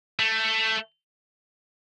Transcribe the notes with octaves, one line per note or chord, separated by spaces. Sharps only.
A3